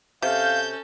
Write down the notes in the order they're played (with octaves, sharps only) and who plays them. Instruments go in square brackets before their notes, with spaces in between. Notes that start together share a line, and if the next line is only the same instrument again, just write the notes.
[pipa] C3 [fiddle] C#4 A4 [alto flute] F5 [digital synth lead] G6